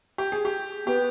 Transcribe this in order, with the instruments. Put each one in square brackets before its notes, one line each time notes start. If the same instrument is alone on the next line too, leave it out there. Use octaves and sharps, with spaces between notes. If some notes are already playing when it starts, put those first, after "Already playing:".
[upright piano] G4
G#4
G4
[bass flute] B3 [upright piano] G4